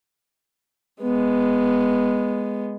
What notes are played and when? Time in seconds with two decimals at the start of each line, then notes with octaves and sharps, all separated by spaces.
1.02 G#3 B3